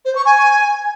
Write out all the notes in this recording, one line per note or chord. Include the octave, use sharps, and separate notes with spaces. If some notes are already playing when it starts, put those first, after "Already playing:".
C5
C#6
G#5